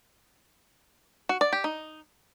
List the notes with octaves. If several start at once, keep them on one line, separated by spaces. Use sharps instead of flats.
F#4
D5
G4
D#4